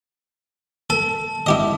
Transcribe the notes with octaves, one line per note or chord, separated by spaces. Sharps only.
A4 A5
E4 G4 D#5